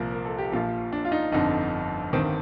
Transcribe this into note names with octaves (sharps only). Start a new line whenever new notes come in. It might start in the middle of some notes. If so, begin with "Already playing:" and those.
Already playing: C2 A#2 F3 A#4
A#4
A4
G4
A#1 A#2 F3 F4
D4
F4
D#4
G1 F2 D3 D#4
G1 G2 D#3 C4